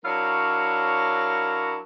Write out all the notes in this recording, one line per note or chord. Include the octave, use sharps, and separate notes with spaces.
F#3 D4 E4 A#4 C#5 F5